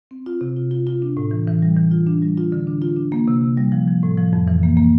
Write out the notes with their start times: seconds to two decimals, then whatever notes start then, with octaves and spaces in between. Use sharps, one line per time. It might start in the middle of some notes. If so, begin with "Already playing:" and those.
0.11 C4
0.26 F4
0.41 C3
0.56 F4
0.71 F4
0.87 F4
1.02 D4
1.17 A2
1.31 E3
1.47 E3
1.62 G3
1.76 E3
1.91 F4
2.07 D4
2.22 G3
2.37 F4
2.52 D3
2.67 D4
2.82 F4
2.97 D4
3.12 A#3
3.28 C3
3.42 C3
3.57 G3
3.72 F3
3.87 F3
4.03 A2
4.17 F3
4.33 F2
4.48 E3
4.63 A#3
4.77 A#3